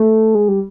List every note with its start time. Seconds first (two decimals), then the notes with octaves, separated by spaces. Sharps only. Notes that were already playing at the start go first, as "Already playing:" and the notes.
Already playing: A3
0.35 G#3
0.48 G3